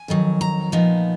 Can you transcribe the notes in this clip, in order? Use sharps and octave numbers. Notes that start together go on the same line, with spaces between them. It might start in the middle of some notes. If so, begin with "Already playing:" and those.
Already playing: G#5
F2 D#3 F#3
A#5
A#2 F3 B3 D#4